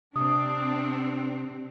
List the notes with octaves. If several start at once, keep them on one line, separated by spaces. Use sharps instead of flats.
C3 C4 D4 D#6